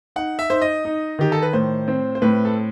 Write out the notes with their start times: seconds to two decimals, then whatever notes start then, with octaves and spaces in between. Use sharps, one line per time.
0.16 D#4 F#5
0.39 E5
0.50 D#4 C5
0.62 D#5
0.85 D#4
1.19 D#3 G4
1.32 A4
1.42 B4
1.53 A2 C5
1.88 C4
2.15 C5
2.22 A2 B4
2.45 A4